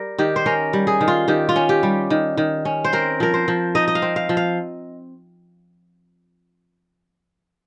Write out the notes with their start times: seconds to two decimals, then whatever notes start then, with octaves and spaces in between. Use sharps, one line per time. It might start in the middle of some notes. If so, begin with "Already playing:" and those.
Already playing: G3 A#4
0.18 D#3 G4
0.36 C5
0.46 C#4 A#4
0.73 G3
0.87 G#4
1.01 D#3
1.08 F4
1.28 D#3 G4
1.49 F4
1.56 C#4
1.69 G4
1.83 G3
2.10 D#3
2.37 D#3
2.65 C#4
2.85 C5
2.93 C4 A#4
3.20 F3 A#4
3.34 C5
3.48 F3
3.75 D#4 D#5
3.88 D#5
3.95 F5
4.02 C4
4.16 F5
4.29 F3
4.37 F5